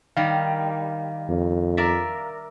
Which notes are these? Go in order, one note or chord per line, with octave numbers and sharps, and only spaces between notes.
D#3 G3 F5
F2
A#4 D5 E5